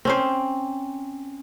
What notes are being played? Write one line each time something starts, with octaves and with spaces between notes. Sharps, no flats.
C4 C#4 C5